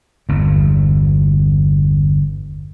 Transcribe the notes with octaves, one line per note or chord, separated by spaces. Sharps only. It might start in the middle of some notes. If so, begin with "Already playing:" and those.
G1 E2